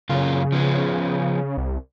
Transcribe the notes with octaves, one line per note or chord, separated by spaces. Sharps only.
F#2 C#3 A#3 F4
F3 B3 G#4
C2